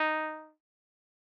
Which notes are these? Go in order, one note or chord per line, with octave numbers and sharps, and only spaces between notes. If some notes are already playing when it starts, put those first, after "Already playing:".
Already playing: D#4